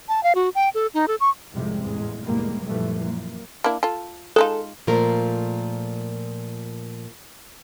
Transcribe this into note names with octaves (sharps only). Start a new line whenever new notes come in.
A5
F5
F#4
G5
A4
D#4
A4
C#6
C2 F2 G#2 C3 G3 G#3
A1 E2 G#3
F1 E2 A2 G3 G#3 A#3
F#2 A#2 E3 F3 G3 A3
F#2 A#3
A#3 D4 E4
F4 A4
G#3 D#4 F4 A4
A#2 F3 A3 A#4